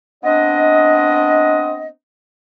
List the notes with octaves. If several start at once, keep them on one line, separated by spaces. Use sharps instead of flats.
B3 C4 D4 D#5